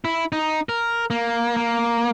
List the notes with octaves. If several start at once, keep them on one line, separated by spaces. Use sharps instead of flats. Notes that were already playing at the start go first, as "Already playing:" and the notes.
E4
D#4
A#4
A#3
A#3